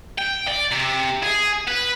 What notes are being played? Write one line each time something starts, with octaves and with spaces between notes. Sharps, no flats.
G5
D5
C3
G#4
B4